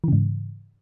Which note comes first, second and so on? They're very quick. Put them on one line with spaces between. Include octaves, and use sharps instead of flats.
E3 C#3 G#2